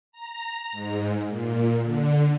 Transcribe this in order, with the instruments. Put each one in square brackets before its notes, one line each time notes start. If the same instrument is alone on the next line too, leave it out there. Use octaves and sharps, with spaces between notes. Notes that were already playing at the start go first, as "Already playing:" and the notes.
[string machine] A#5
G#2
A#2
D3